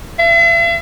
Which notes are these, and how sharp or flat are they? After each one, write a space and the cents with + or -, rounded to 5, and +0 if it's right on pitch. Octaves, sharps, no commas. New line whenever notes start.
E5 +45